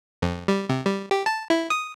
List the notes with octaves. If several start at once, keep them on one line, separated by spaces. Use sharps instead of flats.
F2
G3
C3
G3
G4
A5
E4
D#6